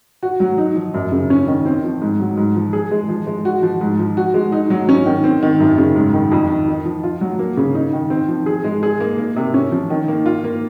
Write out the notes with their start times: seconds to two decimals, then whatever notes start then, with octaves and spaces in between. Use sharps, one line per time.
0.23 F#4
0.40 F#3
0.58 D#4
0.76 F3
0.94 F#2
1.12 C#3
1.30 C#4
1.48 D#3
1.65 C4
1.84 F3
2.02 G#2
2.20 F#3
2.37 G#2
2.56 F3
2.73 G#4
2.92 G#3
3.09 F3
3.27 G#3
3.45 F#4
3.63 F3
3.81 G#2
3.99 F3
4.17 F#4
4.34 G#3
4.52 D#4
4.70 F#3
4.89 C#4
5.06 D#3
5.24 C4
5.43 D#3
5.60 F#2
5.78 C#3
5.96 G#2
6.14 D#3
6.32 F2
6.50 D#3
6.68 D#4
6.85 F3
7.03 F4
7.21 F#3
7.39 A#3
7.57 C#3
7.75 D#4
7.93 D#3
8.10 C4
8.28 F3
8.46 G#4
8.64 G#3
8.83 G#4
9.00 A#3
9.18 A#3
9.36 C3
9.54 C#4
9.72 F3
9.90 D#3
10.08 A#3
10.26 F4
10.44 A#3